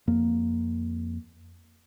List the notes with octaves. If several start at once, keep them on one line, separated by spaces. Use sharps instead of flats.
F2 A#3